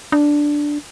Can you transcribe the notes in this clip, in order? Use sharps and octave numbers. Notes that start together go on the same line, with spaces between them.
D4